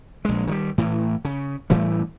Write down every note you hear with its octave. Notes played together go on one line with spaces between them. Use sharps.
A#1 G#3
D#3 F#3 G3
A2 E3
C#3
A2 E3 G3 A3